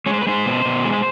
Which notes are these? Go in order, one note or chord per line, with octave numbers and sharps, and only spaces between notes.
G#3 C#5
C5
B4
G#3 C5
B2
B2
G#3